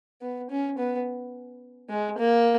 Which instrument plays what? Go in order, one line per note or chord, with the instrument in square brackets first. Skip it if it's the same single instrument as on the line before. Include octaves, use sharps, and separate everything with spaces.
[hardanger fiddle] B3
C#4
B3
G#3
A#3